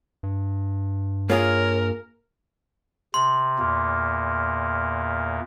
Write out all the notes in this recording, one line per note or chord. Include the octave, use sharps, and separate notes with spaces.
G2
A#3 F4 G#4 A#4 C#5
C3 C6
E2 A#2 A#3